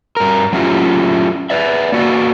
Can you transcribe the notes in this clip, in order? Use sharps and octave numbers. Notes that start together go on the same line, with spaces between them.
G2 A#4
F#3 A3 C#4 E4 F4 G4
B4 D5 E5
A#3 F#4 B4 D5